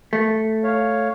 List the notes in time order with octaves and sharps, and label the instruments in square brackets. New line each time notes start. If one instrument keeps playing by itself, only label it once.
[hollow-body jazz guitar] A3
[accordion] C#5 F5